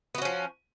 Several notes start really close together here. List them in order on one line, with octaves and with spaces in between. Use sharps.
B3 F#4 C#4 F3